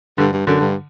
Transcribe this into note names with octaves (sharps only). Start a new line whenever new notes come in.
G2 D3
G2
F#2 D3
G2